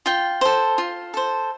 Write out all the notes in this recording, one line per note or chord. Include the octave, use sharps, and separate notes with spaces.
F4 G5
A4 C5
F4
A4 C5